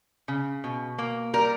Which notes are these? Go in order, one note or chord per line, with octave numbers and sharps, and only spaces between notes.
C#3
B2
A#3
G3 A#4